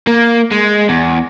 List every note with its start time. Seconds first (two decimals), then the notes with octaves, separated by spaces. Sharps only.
0.07 A#3
0.52 G#3
0.89 E2